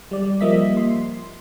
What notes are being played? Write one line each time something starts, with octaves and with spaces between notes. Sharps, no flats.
G3 D5
F3 G3 A#3 D#5 E5 B6
C6